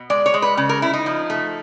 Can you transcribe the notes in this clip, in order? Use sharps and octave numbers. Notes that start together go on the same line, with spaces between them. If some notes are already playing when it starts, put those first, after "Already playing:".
Already playing: B2
G#3 D5
C#5
G#3
B4
C#3
A#4
C#3 E4
D#4
F3
A3